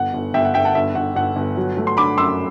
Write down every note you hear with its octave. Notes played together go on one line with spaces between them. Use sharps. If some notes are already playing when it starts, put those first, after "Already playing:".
Already playing: G1 F#5
G1
G1 E5 G5
F#5
G1 E5 G5
F#5 A5
G1 E5
G1 F#5
G1 F#5
G1
F#3
A3
C6
D3 B5 D6
F#2 C6 E6